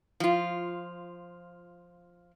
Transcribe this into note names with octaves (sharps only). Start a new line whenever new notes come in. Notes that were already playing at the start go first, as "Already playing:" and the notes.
F3 F4